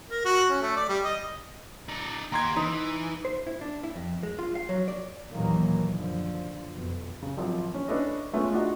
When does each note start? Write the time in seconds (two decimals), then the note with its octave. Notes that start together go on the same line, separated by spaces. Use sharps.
0.11 A#4
0.25 F#4
0.50 C#4
0.62 A3
0.76 D5
0.89 G3
1.04 D#5
1.89 D#4 D5
2.32 D#2 G4 A#5 C6 G#6
2.56 E3 D#4
3.25 C5
3.47 E4
3.61 D4
3.84 E4
3.96 F2
4.23 G#3
4.39 F4
4.55 F5
4.69 F#3
4.88 D5
5.31 D#2 A#2 D#3 E3 F#3 A#3
5.90 F#2 D3 F3
6.71 F2 B2
7.23 C#3
7.37 G#1 F3 F#3
7.74 C#4
7.88 C#4 D4 E4 A4 B4 D#5
8.33 G#3 A3 B3 C#4 F4
8.53 D4 D#4 F4 F#4 D#5